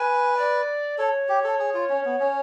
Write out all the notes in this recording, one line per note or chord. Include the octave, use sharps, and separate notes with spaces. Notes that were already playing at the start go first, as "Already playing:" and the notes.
Already playing: B4 G#5
D5
A4 C#5
G4
A4
G#4
F4
C#4
B3
C#4